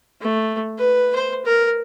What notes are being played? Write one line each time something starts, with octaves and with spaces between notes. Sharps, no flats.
A3
B4
C5
A#4